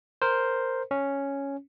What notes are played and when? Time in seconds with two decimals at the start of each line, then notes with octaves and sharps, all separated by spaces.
0.22 A#4 C5
0.91 C#4